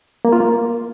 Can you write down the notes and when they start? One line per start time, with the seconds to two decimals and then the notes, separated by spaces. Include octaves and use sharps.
0.25 A#3
0.32 F4
0.40 A#3